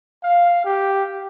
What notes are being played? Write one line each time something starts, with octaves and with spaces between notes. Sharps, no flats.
F5
G4